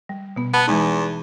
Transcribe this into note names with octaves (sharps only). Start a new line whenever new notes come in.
G3
B2 B3
B3 A5
E2 E3 G#3 D#4